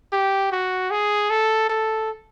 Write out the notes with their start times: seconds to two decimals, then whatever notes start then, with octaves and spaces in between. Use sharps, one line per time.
0.13 G4
0.52 F#4
0.91 G#4
1.30 A4
1.69 A4